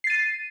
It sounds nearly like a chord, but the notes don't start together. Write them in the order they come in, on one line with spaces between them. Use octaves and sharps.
C7 A6 D#7